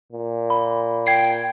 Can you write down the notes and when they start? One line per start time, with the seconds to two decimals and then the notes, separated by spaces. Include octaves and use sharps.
0.13 A#2
0.50 B5
1.07 G5 G#6 C7